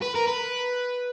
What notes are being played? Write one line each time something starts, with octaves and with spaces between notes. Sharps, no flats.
B4
A#4
B4